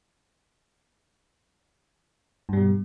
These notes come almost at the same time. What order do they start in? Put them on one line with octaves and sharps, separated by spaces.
G2 G3 B2